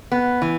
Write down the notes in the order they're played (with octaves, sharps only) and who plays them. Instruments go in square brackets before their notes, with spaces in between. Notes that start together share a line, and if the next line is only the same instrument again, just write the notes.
[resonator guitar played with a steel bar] B3
E3